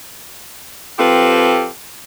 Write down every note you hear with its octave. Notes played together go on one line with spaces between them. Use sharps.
F3 C4 F4 G4 A4 B4